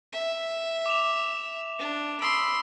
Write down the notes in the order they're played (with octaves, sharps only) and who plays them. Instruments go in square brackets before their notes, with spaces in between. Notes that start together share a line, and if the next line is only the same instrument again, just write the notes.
[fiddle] E5
[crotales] D6 E7 F7
[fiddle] D4
[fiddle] B5 C6 [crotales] D#6 E6 D7